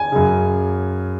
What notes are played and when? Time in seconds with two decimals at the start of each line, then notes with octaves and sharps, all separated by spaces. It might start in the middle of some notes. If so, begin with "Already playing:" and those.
Already playing: G#5
0.12 F#2 C#3